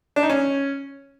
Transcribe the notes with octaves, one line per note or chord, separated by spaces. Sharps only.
D4
D#4
C#4